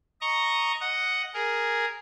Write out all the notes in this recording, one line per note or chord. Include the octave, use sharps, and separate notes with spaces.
D#5 A#5 C#6
D#5 F#5
G#4 A#4